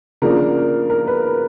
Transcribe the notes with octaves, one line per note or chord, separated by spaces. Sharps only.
C#3 F3 A#3 D4 A#4
A#4
B4